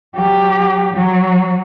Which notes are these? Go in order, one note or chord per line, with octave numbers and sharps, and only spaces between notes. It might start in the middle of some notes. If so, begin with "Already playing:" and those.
F#3 G4
F#3